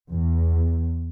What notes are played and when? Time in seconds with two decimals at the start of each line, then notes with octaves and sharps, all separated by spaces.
0.10 E2